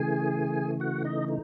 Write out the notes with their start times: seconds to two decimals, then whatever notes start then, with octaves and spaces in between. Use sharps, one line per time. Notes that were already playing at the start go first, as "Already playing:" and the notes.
Already playing: C#3 E3 A3 G#4 G#5
0.80 F#4 F#5
1.04 D#4 D#5
1.28 D#4